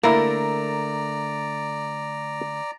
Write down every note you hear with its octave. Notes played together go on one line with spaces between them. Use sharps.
D3 A3 A#3 E4 A#4 D5 A#5